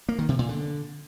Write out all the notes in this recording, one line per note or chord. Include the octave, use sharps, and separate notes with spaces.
A#3
D#3
C3
A#2
D3